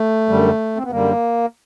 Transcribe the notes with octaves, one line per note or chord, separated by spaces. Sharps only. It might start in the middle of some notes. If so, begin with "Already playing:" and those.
Already playing: A3
F#2 D3 G3
C4
B3
F#2 D3 G3 A#3